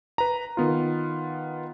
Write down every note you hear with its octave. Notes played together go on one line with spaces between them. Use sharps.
B4 A#5
D#3 B3 F4